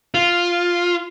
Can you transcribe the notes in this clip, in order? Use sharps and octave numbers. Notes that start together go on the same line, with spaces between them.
F4